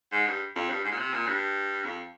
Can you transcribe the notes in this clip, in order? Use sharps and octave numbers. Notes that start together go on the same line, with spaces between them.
G#2
G2
F2
G2
G#2
A#2
C3
A#2
G2
F2